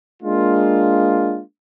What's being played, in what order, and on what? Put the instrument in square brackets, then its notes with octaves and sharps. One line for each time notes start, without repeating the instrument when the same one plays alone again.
[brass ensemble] G#3 A#3 D4 F4